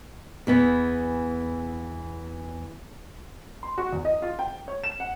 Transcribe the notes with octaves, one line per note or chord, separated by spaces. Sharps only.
E2 E3 B3
C6
F#4
E2
D#5
F4
G5
C#5
E7
F#5